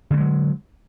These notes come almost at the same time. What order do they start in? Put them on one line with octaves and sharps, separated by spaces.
D3 A3 G#3 F#3